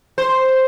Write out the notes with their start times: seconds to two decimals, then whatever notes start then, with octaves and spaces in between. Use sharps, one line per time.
0.18 C5